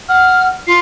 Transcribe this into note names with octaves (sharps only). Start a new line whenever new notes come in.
F#5 F6
F4 C7